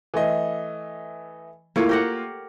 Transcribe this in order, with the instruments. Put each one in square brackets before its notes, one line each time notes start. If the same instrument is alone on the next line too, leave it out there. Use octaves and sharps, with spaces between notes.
[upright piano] E3 A3 D#5
[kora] A2 C#5 [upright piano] A#3 F4
[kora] G4 A#4 F#5